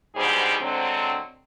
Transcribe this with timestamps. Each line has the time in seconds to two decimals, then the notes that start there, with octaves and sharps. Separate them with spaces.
0.16 G#2 B2 D3 G3 G#4 C5
0.61 D3 F#3 G#3 C4